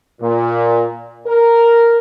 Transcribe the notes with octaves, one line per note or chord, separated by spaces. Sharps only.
A#2
A#4